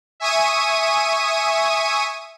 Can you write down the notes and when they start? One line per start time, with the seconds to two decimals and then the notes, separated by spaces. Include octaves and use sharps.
0.20 E5 G#5 C#6 D#6 D#7